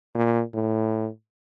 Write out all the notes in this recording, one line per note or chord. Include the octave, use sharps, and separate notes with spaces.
A#2
A2